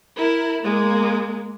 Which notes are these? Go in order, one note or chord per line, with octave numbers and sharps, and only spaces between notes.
E4 A#4
G#3 A#3